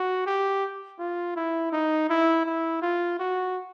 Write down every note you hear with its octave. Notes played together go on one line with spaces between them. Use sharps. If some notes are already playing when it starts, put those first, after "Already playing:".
Already playing: F#4
G4
F4
E4
D#4
E4
E4
F4
F#4